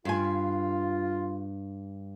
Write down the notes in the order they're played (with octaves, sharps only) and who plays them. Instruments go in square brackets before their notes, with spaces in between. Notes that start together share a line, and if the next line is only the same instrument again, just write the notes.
[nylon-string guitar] G2 G#5 [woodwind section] F4